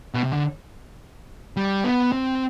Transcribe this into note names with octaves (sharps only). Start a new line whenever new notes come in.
B2
C3
D3
G3
B3
C4